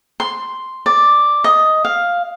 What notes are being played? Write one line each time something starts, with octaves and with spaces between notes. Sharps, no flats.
C6
D5
D#5
F5